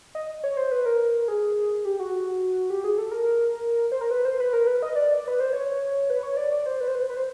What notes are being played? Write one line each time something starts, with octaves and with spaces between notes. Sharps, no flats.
D#5
C#5
C5
B4
A#4
G#4
G4
F#4
G4
G#4
A4
A#4
C5
A#4
B4
C5
B4
A#4
B4
D#5
D5
D5
B4
C5
C#5
B4
C#5
D5
D5
C5
B4
C5
B4
C5
B4
C5